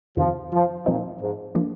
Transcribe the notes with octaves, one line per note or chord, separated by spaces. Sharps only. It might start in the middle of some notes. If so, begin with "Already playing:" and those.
F2 C3 D#3 F3
F3
A#2 F3 C4 D#4
G#2
F3 A#3 D4